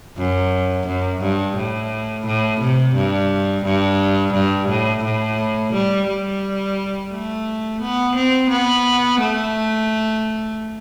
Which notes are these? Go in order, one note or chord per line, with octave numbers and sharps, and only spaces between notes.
F#2
F#2
G2
A2
A2
C3
G2
G2
G2
A2
A2
G3
G3
A3
B3
C4
B3
A3